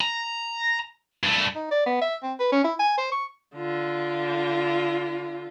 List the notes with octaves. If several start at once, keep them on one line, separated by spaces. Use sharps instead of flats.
A#5
G2 A3
D#4
D5
B3
E5
C4
B4
C#4
E4
G#5
C5
C#6
D3 F4